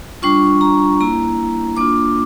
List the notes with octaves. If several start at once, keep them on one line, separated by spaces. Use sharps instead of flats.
G3 D4 F4 C#6
A#5
A#3 E4 A#5
A#3 D4 F4 D6